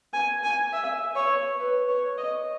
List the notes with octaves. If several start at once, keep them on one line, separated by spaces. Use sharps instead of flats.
G#5
G#5
E5
C#5
B4
C#5
D#5